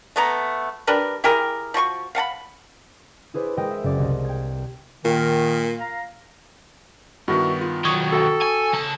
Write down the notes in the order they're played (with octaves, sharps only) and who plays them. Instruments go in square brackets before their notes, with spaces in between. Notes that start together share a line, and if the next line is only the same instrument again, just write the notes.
[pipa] A3 B3 A#5
D4 G4 A#4 B4
E4 G4 G#4 A#4
F3 F#4 C6 C#6
F5 F#5 A5 B5
[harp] E4 G#4 B4 C5 D5
G#3 G#4 A#4 D#5 G5
E5
F#1 D5
C2 D#5
G5 G#6
[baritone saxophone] A#2 [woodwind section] D#3
[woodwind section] F5 A#5
[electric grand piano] G2 D#3 B3 [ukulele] E4 F#4
[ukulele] F4
[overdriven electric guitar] D#3 F#3 [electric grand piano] C#6 D#6 G#6
[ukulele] F#4 G5 [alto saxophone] A4
[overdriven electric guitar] G#5
C#3 A5